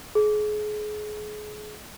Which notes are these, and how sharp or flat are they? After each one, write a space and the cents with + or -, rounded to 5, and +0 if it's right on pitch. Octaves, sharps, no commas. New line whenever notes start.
G#4 +30